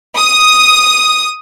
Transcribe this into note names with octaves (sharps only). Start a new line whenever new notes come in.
D#6